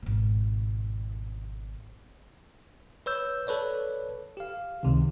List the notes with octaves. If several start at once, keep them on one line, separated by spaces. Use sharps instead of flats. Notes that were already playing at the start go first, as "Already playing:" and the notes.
G#1 B2
B4 C#5 E6 G6
A4 B4 C#5 D5
G4 F5
C#2 C3 D#3